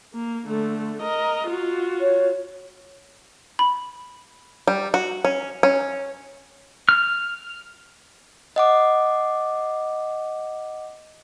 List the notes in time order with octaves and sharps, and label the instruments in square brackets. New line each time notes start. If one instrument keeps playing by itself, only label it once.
[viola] A#3
D3 A3
A#4 D#5
F4 F#4
[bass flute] C#5
[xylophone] B5
[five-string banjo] G3
F#4
C#4
C#4
[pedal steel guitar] F6
[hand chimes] D#5 F#5 D6